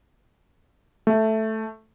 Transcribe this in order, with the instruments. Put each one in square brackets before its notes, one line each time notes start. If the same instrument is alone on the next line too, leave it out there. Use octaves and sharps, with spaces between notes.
[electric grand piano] A3